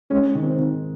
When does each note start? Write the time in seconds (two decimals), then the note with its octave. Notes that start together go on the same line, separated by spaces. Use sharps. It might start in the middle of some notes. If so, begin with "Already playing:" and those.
0.10 G#3 C#4
0.35 D#3
0.42 C4
0.59 D#3